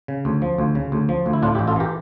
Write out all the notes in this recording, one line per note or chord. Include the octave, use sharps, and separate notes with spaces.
C#3
D2
F3
D2
C#3
D2
F3
D2
E4
A2 D4 F4
E4 G4
A1
F4 A4
E3 G4 A#4